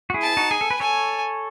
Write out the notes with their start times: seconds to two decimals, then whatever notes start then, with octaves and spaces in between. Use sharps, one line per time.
0.10 F#4
0.14 E4 G#4
0.22 A5
0.37 D#4 F#4
0.51 G#4 G#5
0.61 A4
0.70 B4
0.80 A4 C#5 G#5